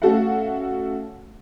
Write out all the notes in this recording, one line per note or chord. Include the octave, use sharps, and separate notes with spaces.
A3 C#4 F#4 A4 F5 F#5